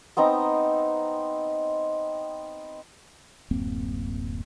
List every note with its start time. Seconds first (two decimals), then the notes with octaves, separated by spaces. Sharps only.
0.17 B3 C4 D#4 A#5
3.51 D1 F#2 A#3 C4